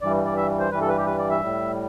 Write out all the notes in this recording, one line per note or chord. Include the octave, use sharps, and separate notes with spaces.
G2 E3 G3 D5
D5
E5
C5
G2 E3 G3 B4
A4
B4
G4
B4
D5
E5
A2 G3